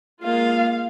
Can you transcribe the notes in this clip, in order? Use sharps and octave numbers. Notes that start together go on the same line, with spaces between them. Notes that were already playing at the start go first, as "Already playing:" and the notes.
G#3 A#3 F4 F5